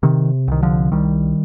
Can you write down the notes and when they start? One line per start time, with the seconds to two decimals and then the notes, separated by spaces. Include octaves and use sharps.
0.03 C3 D#3
0.48 C2 D#3
0.63 D3 F3
0.92 C2 D#3 G3